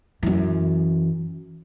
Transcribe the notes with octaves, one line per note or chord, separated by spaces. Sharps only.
F#2 E3